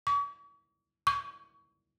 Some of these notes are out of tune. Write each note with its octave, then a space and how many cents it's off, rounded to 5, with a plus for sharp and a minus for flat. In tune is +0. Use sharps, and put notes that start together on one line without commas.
C#6 +45
C#6 +25